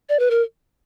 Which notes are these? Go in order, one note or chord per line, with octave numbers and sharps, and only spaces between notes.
D5
B4
A#4